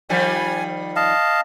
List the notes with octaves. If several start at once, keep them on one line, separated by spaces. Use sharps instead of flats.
D#3 F3 G3 G#5
D#5 F5 A5